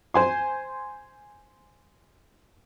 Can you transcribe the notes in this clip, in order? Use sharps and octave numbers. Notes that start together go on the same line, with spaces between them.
C5 G#5 C6